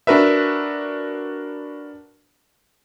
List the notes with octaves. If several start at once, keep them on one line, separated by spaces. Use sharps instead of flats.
D4 F#4 A#4 B4 E5